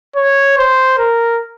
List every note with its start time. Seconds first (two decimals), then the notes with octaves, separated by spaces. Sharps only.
0.16 C#5
0.58 C5
0.98 A#4